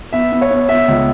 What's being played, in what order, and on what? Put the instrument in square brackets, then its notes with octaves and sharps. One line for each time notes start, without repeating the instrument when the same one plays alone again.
[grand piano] B3 E5
B3
C#5
B3
B3 E5
C#2